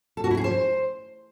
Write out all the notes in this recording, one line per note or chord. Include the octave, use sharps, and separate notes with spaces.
A4
F#4
E4
G#4
C5